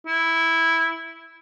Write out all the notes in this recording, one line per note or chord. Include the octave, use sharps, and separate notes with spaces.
E4